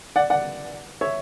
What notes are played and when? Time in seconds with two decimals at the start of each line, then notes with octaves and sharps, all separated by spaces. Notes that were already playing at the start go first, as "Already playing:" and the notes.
0.16 D5 F#5
0.30 D5 F#5
1.01 C#5 E5